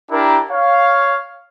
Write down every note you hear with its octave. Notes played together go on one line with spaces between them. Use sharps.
D4 E4 G4 A#4
C#5 F5